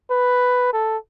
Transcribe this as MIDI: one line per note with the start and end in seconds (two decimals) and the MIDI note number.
0.11 0.69 71
0.73 0.97 69